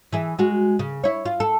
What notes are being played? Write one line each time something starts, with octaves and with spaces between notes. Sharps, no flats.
E3 G#4 E5
G#3 F#4
C#3
E4 C#5
F4
A4